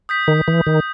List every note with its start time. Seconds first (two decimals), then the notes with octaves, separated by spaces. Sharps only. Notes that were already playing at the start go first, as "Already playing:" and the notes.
0.09 D#6 G6 B6
0.28 D#3
0.48 E3
0.66 D#3